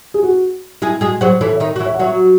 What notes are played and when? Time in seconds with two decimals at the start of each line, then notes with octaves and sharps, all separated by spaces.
0.14 G#4
0.23 F#4
0.82 G#3 E4 G#4
1.01 G#3 F#4 G#4
1.21 F#3 F#4 G#4 C5
1.41 E3 E4 A4 C#5
1.56 C#5 E5
1.60 D#3 D#4
1.76 F#4
1.80 E3 E4
1.85 C#5 E5
1.94 F#5
1.99 F#3 F#4 C#5 E5